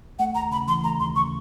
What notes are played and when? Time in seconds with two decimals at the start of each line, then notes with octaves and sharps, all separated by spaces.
0.19 A3 F#5
0.35 D#2 A#5
0.51 C#3 B5
0.68 E3 C6
0.83 A3 A#5
1.00 D#2 C6
1.16 C#3 C#6